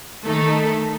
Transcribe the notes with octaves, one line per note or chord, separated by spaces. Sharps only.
D#3 A3 D#4 A4